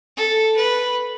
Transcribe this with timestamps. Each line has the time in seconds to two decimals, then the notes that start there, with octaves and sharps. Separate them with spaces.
0.17 A4
0.56 B4